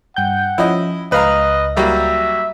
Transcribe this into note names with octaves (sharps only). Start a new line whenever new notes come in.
G2 F#5 G5 G6
F3 C#4 E4 D#5
C#2 B4 D#5 F5 A#5
F#3 G3 A#3 E5